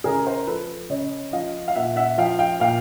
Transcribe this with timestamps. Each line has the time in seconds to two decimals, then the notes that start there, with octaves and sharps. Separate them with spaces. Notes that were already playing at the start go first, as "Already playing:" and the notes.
0.04 C#3 G#4 A#4
0.26 A#4 C5
0.47 F3 A4 B4
0.90 C#3 C#5 D#5
1.32 F3 D#5 F5
1.68 F5
1.75 A#2 E5 F#5
1.96 E5 F#5
2.18 F3 F5 G5
2.39 F5 G5
2.60 A#2 F5 G5